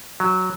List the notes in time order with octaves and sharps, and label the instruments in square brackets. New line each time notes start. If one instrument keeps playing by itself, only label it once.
[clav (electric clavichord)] F#3